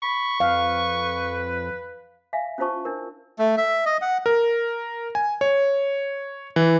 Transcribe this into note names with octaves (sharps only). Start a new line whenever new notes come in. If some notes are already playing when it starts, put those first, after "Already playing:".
B5 C#6
F2 B4 F5
E5 F5 G#5
C#4 E4 F4 C5 A5 C#6
D4 E4 A#4
A3
E5
D#5
F#5
A#4
G#5
C#5
E3